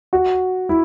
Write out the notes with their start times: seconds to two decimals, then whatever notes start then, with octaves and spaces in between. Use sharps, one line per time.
0.13 F#4
0.69 E4